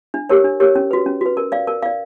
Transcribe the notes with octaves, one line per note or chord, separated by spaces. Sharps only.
D4
G4 A#4 C#5
D4
G4 A#4 C#5
C#4
F#4 B4
C#4
F#4 B4
A#4
D5 F5
A#4
D5 F5